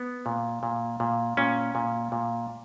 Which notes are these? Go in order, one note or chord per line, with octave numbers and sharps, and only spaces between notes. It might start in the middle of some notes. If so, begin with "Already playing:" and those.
Already playing: B3
A#2
A#2
A#2
A#2 C#4
A#2
A#2